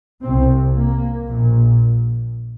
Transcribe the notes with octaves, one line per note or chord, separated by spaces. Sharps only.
C2 C3 C4
A#3
A#1 A#2